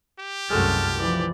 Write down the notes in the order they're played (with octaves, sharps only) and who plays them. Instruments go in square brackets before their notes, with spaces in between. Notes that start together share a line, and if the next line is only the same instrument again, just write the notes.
[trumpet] G4
[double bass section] C2 F#2 [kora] G#3 A3 F#4 [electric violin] A5 F6
[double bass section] E3 F3 [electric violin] D5